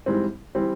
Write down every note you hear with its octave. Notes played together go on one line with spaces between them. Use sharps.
G#2 E3 G3 C4
E3 G3 C4